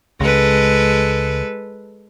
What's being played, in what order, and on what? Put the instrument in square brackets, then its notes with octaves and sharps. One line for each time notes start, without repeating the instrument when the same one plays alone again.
[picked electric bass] C#2 [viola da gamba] G#3 A4 B4